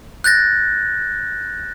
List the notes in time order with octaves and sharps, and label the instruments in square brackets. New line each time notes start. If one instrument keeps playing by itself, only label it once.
[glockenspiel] F#6 G6 A6 A#6